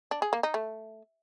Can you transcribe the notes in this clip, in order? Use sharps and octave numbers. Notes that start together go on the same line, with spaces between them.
D4
G#4
A#3
D#4
A3